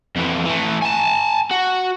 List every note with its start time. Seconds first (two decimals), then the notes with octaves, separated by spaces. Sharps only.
0.16 F2 E3
0.45 E3 A3
0.82 G#5 A5
1.51 F#4